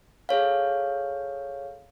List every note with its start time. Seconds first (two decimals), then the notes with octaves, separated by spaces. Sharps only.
0.29 G#4 A4 C#5 F5